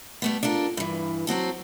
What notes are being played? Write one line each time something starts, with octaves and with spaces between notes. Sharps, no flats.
G3 A3 B3
D4 F4 A4 A#4
G2 E3
F#3 C4 F#4 A4